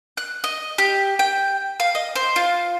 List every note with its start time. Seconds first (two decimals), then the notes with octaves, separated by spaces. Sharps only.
0.17 F#6
0.44 D#5
0.78 G4
1.19 G5
1.80 F5
1.95 D#5
2.16 C5
2.36 F4